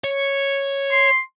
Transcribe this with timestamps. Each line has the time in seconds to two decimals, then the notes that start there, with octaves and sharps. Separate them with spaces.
0.04 C#5
0.92 C6